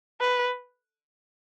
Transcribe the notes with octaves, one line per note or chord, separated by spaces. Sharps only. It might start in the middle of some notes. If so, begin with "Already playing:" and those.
B4